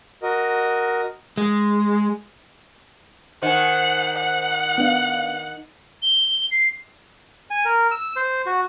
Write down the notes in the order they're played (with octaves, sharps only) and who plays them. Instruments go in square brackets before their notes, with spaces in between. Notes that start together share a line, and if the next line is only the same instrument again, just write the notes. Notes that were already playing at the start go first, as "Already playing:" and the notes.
[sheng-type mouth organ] F#4 A#4 D#5
[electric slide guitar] G#3
[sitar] D#3 [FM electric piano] C5 G#5 [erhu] F#5
[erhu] F#5
[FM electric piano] B3 D4 F5
[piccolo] G7
C7
[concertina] G#5
A#4
E6
C5
F#4